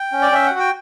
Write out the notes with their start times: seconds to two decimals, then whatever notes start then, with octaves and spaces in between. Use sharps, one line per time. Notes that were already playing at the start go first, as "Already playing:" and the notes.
Already playing: G5
0.12 C#4
0.22 D5
0.32 C#4 E5
0.47 F#4 F#5
0.59 G5